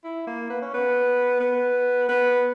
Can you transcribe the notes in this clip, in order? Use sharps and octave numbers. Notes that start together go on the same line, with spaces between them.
E4
A#3
B3
C#4
B3
B3
B3